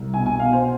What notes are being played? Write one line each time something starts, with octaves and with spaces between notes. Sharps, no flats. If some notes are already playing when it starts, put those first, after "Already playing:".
Already playing: C2
B2 G#5
G#5
B2 F5
C5